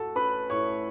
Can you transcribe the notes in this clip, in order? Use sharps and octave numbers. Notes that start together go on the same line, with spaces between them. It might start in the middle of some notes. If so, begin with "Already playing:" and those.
Already playing: A2 A3 F#4 A4 A5
C#4 B4 B5
A2 C#5 C#6